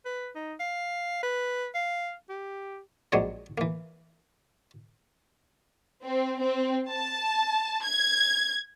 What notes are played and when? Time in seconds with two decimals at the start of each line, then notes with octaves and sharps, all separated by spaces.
0.06 B4
0.35 D#4
0.60 F5
1.23 B4
1.75 F5
2.29 G4
3.12 A#1 F#3 G#3 C4 C#5 D5
3.58 E3 A#3
6.05 C4
6.41 C4
6.92 A5
7.85 G#6